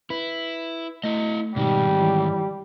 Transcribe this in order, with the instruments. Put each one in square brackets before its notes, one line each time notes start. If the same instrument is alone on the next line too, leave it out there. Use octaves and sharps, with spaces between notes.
[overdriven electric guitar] E4 [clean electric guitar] B4
[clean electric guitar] A3 [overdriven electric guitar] E4 D#5
[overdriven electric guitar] G#2 D#3 [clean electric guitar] B2 D#4 [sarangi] G3
[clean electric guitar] E3 E4 C#5